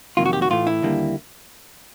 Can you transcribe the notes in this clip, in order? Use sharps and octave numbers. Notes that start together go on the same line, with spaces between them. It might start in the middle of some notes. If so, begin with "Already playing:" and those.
F2 C3 D#3 F#3 A#3 F4
F#4
G4
F#4
A2 E3 A3 F4
E4
D#2 D3 G3 A#3